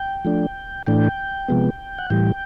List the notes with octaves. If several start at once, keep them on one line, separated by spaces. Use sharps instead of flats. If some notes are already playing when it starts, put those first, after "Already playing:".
Already playing: G5
F3 A3 D4
A2 E3 A3 D4 G5
C3 F3 G#3 B3
F#5
A2 E3 G3 G5